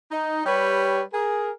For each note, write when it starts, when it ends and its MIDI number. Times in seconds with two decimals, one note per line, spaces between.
0.11 0.43 63
0.46 1.02 55
0.46 1.02 67
0.46 1.02 71
0.46 1.02 73
1.14 1.51 68
1.14 1.51 70